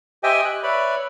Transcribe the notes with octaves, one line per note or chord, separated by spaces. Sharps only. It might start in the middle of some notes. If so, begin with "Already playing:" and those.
G4 C5 D#5 E5 G5 G#5
F#6
B4 C#5 D5 E5 B5